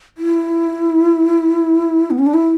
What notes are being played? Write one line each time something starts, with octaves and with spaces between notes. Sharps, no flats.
E4
B3
C#4
D4
E4